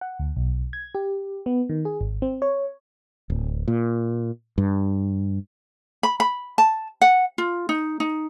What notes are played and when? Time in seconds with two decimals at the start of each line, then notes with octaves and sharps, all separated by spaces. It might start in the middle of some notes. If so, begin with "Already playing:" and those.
0.01 F#5
0.19 D2
0.36 B1
0.73 G#6
0.95 G4
1.46 B3
1.69 D#3
1.85 G#4
2.01 G#1
2.22 C4
2.42 C#5
3.30 D1
3.68 A#2
4.58 G2
6.03 B5
6.20 B5
6.58 A5
7.01 F#5
7.38 F4
7.69 D#4
8.00 D#4